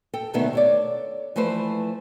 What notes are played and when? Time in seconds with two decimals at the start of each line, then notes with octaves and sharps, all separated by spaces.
0.13 A4 G5
0.33 D2 B2 D#3 A3 B3 E5
0.53 A4 C#5 D5
1.36 E3 F3 A3 B4 C5